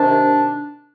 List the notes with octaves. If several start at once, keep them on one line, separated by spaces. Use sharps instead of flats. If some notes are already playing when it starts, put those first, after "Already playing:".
Already playing: C3 D#3 D4